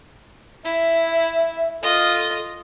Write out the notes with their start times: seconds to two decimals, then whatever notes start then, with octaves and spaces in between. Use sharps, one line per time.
0.65 E4 E5
1.82 F4 A4 D#5